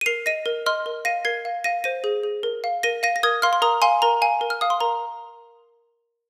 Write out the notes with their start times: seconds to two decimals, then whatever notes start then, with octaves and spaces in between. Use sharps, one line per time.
0.01 D#7
0.06 A#4 C7 F7
0.26 D#5 A#6 D#7
0.46 A#4
0.66 D#5 C6 F6
0.86 A#4
1.05 F5 A#6 D#7
1.25 A#4 G#6 C7
1.45 F5
1.64 F5 A#6 D#7
1.84 C5 A#6 D#7
2.04 G#4
2.23 G#4
2.43 A#4
2.64 F5
2.83 A#4 A#6 D#7
3.03 F5 A#6 D#7
3.16 A#6
3.23 A#4 D#6 G#6
3.42 F5 C6 F6
3.53 C6
3.62 A#4 A#5 D#6
3.82 F5 G#5 C6
4.02 A#4 A#5
4.22 F5 G#5
4.41 A#4
4.50 F6
4.61 F5 D#6
4.70 C6
4.80 A#4 A#5